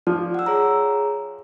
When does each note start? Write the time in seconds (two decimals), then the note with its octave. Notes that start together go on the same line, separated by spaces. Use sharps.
0.07 F3 D5
0.34 F#5 E6
0.46 G#4 C#5 A#5